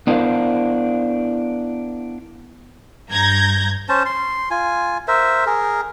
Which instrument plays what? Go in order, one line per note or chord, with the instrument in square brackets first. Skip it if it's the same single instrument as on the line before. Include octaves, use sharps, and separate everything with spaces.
[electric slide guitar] B3 D4 E4 A#4 C5 F5
[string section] G2 A#5 G6 G#6 A#6
[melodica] C#4 C5 A5
C6
F4 G#5
A#4 C5 E5
G#4 A#4